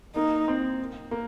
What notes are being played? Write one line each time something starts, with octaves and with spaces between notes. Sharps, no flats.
A#3 D#4
C4
A#3